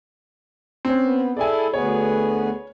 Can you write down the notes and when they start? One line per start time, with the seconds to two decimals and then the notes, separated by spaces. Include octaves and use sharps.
0.85 C4 C#4
1.03 B3
1.37 E4 G#4 A4 D5 G#5
1.74 D2 B3 G#4 C#5